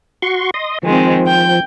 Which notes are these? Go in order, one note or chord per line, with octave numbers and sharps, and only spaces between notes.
F#4 C6 C#6
D#5 C6 D#6
D#3 F3 G#3 C4
G5 G6